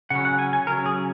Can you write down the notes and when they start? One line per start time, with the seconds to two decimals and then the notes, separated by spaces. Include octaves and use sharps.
0.10 C#3 F#3 C#4 F#5
0.25 F#5
0.39 G#5
0.53 G#5
0.67 C#3 F#3 C#4 A#4
0.86 G#4